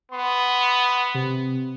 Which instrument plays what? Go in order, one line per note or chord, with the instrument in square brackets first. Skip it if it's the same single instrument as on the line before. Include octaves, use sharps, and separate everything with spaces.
[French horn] B3 [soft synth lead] C6
[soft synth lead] C3